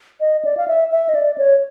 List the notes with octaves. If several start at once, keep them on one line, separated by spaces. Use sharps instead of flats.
D#5
D5
F5
E5
E5
D#5
D5
C#5